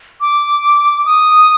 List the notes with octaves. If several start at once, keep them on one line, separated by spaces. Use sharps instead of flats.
D6
D#6